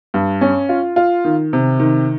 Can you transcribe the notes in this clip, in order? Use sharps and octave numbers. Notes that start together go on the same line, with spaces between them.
G2
C#4
F4
F4
D#3
C3
D#3